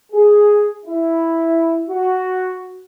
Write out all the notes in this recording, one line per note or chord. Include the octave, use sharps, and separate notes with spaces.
G#4
E4
F#4